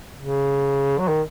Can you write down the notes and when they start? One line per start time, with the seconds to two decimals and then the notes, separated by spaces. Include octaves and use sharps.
0.19 C#3
0.99 F#3
1.08 D#3